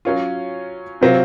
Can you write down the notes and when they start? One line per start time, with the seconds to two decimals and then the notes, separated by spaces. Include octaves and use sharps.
0.05 F#3 C#4 F4
1.01 C3 F#3 C4 F4